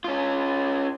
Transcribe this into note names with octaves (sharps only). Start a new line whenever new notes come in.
C#4 F4